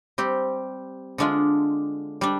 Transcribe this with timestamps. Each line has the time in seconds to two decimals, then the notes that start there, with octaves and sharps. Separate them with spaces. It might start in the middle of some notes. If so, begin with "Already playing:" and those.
0.18 G3 C4 G4
1.18 D3 G#3 D4 F4
2.21 G3 D4